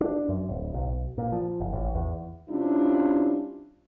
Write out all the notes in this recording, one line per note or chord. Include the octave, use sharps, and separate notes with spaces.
D4
F#2
D1
B1
A#2
F3
F#1
A1
E2
C3 G3 C#4 D4 E4 F4